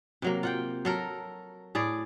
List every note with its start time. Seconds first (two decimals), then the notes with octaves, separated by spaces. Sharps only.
0.22 C3 F#3 A#3
0.43 F4 F#5 G5
0.85 F#3 A4 A#4
1.75 A2 G#4 D5